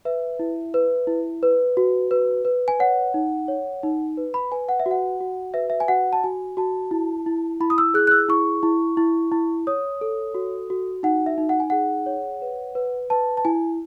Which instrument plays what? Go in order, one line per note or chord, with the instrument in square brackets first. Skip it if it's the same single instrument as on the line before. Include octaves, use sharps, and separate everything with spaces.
[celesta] B4 E5
E4
B4
E4
B4
F#4
B4
B4
G#5
C#5 F#5
D#4
C#5
D#4
B4
B5
B4 G#5
F#5
E5
F#4
F#5
F#4
B4 E5
E5
G#5
F#4 F#5
A5
F#4 G#5
F#4 A5
E4
E4
E4 B5
D#6
E6
G#4 F#6
F#6
E6
E4 C#6
E4
E4
E4
C#5 D#6
A4
F#4
F#4
D#4 F#5
E5
D#4
F#5
G#5
G#4 F#5
C#5
B4
B4
B4 A5
A5
E4 G#5